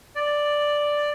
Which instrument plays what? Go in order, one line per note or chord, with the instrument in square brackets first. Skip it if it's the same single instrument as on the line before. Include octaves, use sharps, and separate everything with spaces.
[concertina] D5